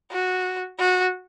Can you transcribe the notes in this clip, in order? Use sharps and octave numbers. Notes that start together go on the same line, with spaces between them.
F#4
F#4